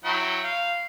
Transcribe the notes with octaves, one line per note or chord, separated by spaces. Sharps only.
F#3 E4 G5
F5